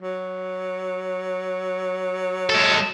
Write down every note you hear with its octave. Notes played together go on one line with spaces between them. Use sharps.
F#3
G#3 A4